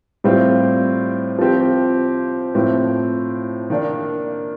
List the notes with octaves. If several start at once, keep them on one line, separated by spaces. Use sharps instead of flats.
A2 G3 C4 F4
F3 C4 G4
A2 F3 C4
D#3 A#3 D4